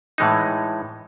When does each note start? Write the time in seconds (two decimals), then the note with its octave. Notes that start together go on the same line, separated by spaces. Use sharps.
0.18 A2 E3 G#3 D#4